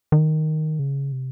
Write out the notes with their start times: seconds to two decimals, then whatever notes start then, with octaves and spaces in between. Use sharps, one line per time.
0.12 D#3
0.79 C#3
1.12 C3